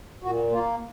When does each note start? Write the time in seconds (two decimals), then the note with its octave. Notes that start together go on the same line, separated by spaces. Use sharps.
0.22 A#2 F#4
0.51 A#3 F4